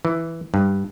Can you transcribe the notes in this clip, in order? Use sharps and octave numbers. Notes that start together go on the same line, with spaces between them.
E3
G2